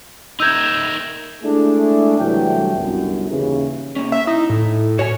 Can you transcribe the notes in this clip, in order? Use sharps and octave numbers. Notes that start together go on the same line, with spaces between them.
D#4 A#4 E5 E6 G6 G#6
G#3 A3 D4 E4 G#4 A4
C2 G2 E3 F#3 A3 G5
G1 C2 F#2
D#2 C#3 E3
C3 A#3 C#4
E5
D#4 E4
A2
F#4 A#4 C#5 G#5